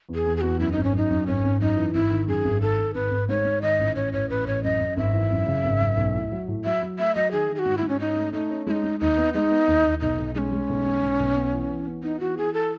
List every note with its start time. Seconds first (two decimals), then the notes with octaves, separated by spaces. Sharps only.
0.09 E2
0.15 G#4
0.26 E2
0.37 G#4
0.41 E2 F#4
0.59 F#2 E4
0.72 G#1 D#4
0.84 C#4
0.92 F#2 D#4
1.10 F#2
1.27 G#1 C#4
1.43 G#1
1.61 F#2 D#4
1.76 E3
1.94 G#1 E4
2.10 D#3
2.27 F#2 G#4
2.44 G#1
2.61 D#3 A4
2.78 D#3
2.94 G#1 B4
3.11 G#1
3.29 G#2 C#5
3.45 G#2
3.62 D#3 D#5
3.79 A1
3.95 A1 C#5
4.13 A1 C#5
4.29 A1 B4
4.46 A1 C#5
4.63 F#2 D#5
4.80 F#2
4.97 G#1 E5
5.13 E3
5.31 F#2
5.47 C#3
5.64 G#1
5.81 F#2
5.97 B1
6.14 A2
6.32 F#3
6.48 A2
6.65 F#3 E5
6.82 F#3
6.99 A3 E5
7.15 F#3 D#5
7.32 D#3 G#4
7.49 D#3
7.55 G#4
7.59 F#4
7.65 G#2
7.78 G#2 E4
7.89 C#4
8.00 C#4 D#4
8.16 A3
8.33 A3 D#4
8.51 C#4
8.67 G#3 D#4 E4
8.84 G#3
9.00 D#2 D#4
9.17 B3
9.34 G#3 D#4
9.51 B3
9.67 D#2
9.84 D#2
10.01 B1 D#4
10.18 B1
10.35 G#3 C#4 D#4
10.52 G#3
10.69 B1
10.86 G#3
11.02 B1
11.20 B1
11.36 B3
11.53 E3
11.70 E3
11.86 B3
12.03 B3 D#4
12.20 E3 F#4
12.37 E3 G#4
12.54 A4